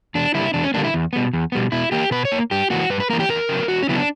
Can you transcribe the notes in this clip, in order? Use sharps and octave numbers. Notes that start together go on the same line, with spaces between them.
E2 D4
D3 G3 A#3 E4
E2 D4
C#4
D3 G3 A#3 D4
E4
E2
B2 G3 B3
E2
B2 G3 B3
B2 E4
A#3 G4
B2 B4
C#5
A#3
G2 G4
E3 A#3 F#4
G2 B4
B4
E3 A#3 A#4
G4
E2 A#4
C#3 F#3 B3
E2 F#4
C#4
C#3 F#3 B3 E4
D4